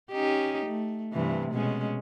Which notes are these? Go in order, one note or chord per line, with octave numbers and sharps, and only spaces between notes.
C#4 D#4 G4
A3
G2 C3 E3
B2 G#3 C#4